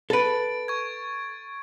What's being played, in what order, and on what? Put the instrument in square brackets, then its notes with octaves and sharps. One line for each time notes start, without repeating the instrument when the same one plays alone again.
[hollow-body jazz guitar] A4 B4 [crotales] A6 D7
[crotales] C#6 G#6